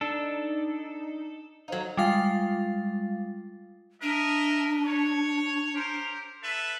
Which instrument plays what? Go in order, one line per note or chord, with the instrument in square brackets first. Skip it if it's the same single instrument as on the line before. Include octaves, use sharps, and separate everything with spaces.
[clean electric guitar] D4 [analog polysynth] D#4 [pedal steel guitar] A4
[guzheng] F#3 D#4 [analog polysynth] A4 C5 F5
[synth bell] G3 G#3 F4 F5 A6
[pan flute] D4 [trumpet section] A#4 D#5 E5
[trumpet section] C#5
G4 A#4 C5
A4 B4 E5